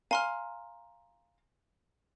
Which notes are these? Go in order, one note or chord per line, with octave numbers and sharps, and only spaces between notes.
F5 G#5 A#5 C6 F6